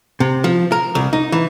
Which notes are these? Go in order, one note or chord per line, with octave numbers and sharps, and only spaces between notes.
C3
F3
A#4
C2
D#4
E3